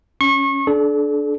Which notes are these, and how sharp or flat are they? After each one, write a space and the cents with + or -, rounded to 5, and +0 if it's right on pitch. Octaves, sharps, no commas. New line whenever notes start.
C#4 +0 C#6 -30
D4 +0 A4 -40